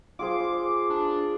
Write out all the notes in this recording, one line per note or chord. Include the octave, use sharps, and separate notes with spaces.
F4 G#4 C5 D6
D4